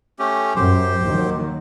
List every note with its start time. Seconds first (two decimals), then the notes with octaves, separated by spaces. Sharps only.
0.19 A3 C#4 G4
0.56 F#2 G4 C5
1.07 D#2 D#3 F#3